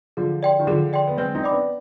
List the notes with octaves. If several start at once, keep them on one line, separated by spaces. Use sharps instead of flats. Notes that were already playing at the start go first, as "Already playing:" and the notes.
D3 F3 G#4
D5 G5 C6
D#3
D3 F3 G#4
D5 G5 C6
B3
G#3 C4 B4
C4 D#4
D5 G5 B5 D6
B3 D4